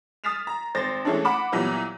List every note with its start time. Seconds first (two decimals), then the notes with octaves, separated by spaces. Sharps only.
0.24 D#6 F6 A6 B6 E7 F7
0.47 A#5
0.75 G#1 C5 A6 A#6
1.05 E3 G#3 A3 C#4 D4
1.25 F#5 B5 D6 E7
1.52 A#2 E3 F#3 G3 B3